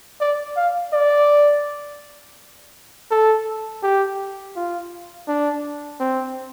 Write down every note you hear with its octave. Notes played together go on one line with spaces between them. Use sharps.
D5
F5
D5
A4
G4
F4
D4
C4